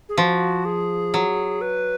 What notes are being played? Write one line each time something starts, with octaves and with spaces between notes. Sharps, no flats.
G#4
F3 F#4
G#4
F#3
B4